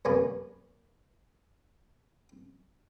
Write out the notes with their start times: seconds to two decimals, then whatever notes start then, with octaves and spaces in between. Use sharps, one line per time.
0.05 F#2 C3 A#3 B4 G#5 C#6